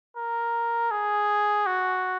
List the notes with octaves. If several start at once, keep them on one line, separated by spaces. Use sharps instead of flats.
A#4
G#4
F#4